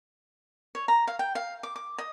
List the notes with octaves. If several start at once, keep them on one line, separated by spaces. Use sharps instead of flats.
C#5
A#5
F5
G5
F5
D6
D6
D#5